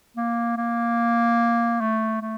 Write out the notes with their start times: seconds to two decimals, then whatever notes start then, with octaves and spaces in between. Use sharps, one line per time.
0.17 A#3
0.57 A#3
1.81 A3
2.21 A3